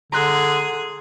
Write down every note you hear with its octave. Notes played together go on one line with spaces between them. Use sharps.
D3 G#4 A#5 C6 F#6